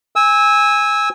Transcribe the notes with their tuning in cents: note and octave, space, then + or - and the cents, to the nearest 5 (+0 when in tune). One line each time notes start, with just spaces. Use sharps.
G#5 -15 E6 -20